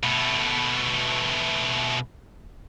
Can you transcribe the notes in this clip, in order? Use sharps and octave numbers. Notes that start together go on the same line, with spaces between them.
B2 A3